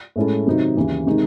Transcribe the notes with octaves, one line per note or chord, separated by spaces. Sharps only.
A2 G#3 C#4 E4 A4
C3 D#3 F#3 C4 D#4
D#2 C#3 E3
C3 D#3 G#3 D#4